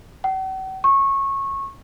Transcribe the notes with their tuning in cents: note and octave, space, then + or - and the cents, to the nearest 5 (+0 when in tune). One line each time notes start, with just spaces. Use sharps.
F#5 +45
C#6 -20